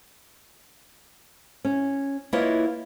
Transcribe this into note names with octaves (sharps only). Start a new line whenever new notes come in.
C#4
A#3 E4 F4 B4 C#5 D#5